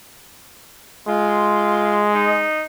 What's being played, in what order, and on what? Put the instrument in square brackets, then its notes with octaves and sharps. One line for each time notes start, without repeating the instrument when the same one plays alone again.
[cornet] G#3 [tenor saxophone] F4
[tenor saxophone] D#4